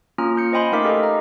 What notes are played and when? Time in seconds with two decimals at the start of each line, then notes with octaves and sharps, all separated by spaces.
0.18 A#3 C#4 F4 A#5 F6
0.37 G6 C#7
0.52 C5 D#5 G5 G#5 B5 C6
0.72 A3 D#4 A#4 F5 D6 B6
0.85 G4 A4 D#5
1.03 A#5